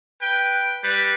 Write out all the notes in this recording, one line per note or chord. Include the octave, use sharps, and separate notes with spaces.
B4 G5
G3 B4